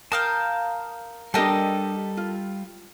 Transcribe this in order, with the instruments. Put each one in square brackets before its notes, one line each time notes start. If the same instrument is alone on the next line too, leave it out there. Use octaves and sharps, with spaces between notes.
[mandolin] A#4 F5 G5 [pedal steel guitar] A5 D#6 F6
[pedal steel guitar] G3 [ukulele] D4 G4 G5 [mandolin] A4 A#4 D#5
[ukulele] F4